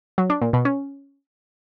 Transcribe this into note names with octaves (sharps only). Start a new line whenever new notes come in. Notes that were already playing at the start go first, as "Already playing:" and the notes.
F#3
D4
A#2
B2
C#4